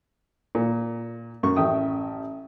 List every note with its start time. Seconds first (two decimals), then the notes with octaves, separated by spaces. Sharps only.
0.55 A#2
1.43 F#2 A#4 C#6
1.56 A1 E5 G5 D#6